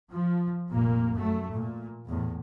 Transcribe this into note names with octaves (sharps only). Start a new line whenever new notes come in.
F3
F1 A#2 A#3
F#2 A3
A#2
E2 A2